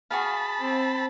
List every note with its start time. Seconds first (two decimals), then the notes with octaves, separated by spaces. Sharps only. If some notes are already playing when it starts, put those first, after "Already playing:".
0.11 F#4 G#4 F5 A5 B5
0.59 C4